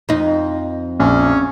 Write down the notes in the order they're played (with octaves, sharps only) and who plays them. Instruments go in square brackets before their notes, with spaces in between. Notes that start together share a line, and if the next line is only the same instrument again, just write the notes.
[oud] F2 D#4
[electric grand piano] A#1 [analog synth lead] C#4